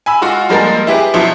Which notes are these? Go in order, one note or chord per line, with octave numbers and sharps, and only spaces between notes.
G#5 B5 E6
G#3 F4 F#4
G2 F3 G#3 A#3 A#4 A6
E4 G4 G#4 B4
B2 F3 F#3 E4